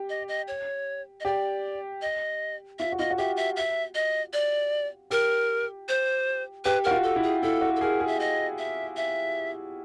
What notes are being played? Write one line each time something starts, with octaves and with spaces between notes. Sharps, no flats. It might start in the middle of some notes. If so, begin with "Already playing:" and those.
Already playing: G4
D#5
D#5
C#5
D#5
G4 D5
D#5
F4 E5
F#4
F4 D#5
F#4
G4 E5
E5
E5
D#5
D5
G4 A#4
C5
G4 B4
F#4 A#4
F4
A4
E4
G#4
E4 A4
F#4
A4
G#4 A#4
G#4
E5
D#5
E5
E5